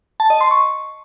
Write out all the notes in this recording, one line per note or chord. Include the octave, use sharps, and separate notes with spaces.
A5
D#5
C6
C#6